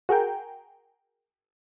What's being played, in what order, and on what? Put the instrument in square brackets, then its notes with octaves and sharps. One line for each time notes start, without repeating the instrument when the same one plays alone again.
[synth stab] F#4 G#4 A#4 G5